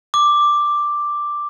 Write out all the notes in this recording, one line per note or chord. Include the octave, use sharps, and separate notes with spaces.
D6